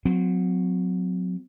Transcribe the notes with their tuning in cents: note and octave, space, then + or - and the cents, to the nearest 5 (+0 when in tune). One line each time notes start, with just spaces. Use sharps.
F#3 -25 C4 -35